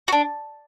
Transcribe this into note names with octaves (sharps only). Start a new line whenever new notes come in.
F#4
D4